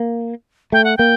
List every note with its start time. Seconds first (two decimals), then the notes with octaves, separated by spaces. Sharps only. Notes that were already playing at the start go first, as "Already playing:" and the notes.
Already playing: A#3
0.72 A3 G5
0.84 F#5
0.97 A#3 G5